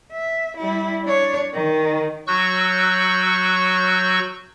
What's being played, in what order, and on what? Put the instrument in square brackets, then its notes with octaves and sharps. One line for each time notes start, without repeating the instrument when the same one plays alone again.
[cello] E5
G3 E4
D4 C#5
D#3
[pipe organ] F#3 F#4 C#6 E6 F#6 G6